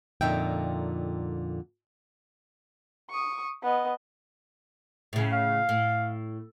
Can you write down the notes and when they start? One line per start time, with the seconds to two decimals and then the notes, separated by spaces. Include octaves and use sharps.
0.21 F2 A#2 D3 D#4 E5 G5
3.11 C#6 D#6
3.63 B3 D#5
5.13 A2 C#3
5.33 F5
5.69 A2